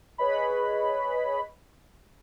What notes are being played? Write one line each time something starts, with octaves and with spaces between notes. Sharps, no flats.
G#4 B4 C#5 D#5 B5